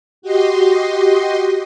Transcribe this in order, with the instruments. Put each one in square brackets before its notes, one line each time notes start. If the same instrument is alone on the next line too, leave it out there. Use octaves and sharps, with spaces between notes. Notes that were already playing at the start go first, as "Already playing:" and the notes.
[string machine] F#4 G4 D#5 C6